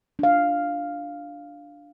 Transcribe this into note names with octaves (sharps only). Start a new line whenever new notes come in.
D4 F5